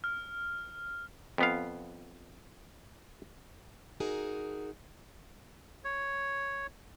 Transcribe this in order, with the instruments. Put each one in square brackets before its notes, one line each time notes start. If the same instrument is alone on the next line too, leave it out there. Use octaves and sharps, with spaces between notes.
[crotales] F6
[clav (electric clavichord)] F2 B3 F5
[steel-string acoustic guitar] D#4 F#4 G#4 A#4
[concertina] C#5